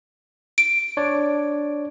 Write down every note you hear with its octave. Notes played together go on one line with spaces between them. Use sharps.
D7
D4 C#5 D5